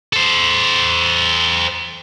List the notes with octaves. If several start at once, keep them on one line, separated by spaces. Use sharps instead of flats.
A4 C5